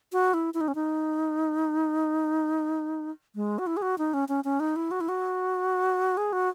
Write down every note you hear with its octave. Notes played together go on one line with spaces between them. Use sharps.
F#4
E4
E4
D#4
C#4
D#4
G#3
F#4
E4
G#4
F#4
D#4
C#4
C#4
C#4
D#4
E4
F#4
E4
F#4
G#4
F#4